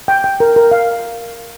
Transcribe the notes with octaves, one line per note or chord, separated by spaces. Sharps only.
G5
G5
A#4
A#4
F5